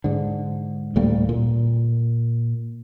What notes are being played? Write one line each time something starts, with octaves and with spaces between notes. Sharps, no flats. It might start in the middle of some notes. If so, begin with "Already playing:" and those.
G#2 D3
D2 A2 G3 A#3
A#2